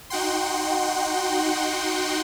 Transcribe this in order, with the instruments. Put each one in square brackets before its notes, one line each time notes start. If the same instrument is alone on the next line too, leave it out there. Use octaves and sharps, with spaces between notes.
[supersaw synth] D#4 F#4 F#5 G5 C6